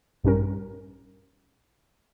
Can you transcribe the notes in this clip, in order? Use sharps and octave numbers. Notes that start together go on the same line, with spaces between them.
A#1 G2 G3 C#4 A#4